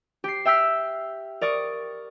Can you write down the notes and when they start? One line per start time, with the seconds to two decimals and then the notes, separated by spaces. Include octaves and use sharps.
0.24 G4 C7
0.45 E5 G5 E6 F6 B6
1.41 A#4 D5 C#6 D#6